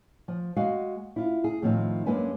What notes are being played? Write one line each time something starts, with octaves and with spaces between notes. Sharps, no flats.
F3
G#3 F#4 F5
E4 F4
G#4
A2 D#3 F3 C4 F4
F#2 G#3 A#3 D4 B4 G#5